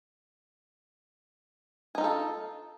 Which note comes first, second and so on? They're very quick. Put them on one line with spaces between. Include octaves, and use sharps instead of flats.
G#4 D#4 F4 A4